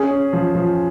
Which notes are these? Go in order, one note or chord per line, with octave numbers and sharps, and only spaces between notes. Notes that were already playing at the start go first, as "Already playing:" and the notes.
Already playing: C#4 G#4
C#4
F3
F3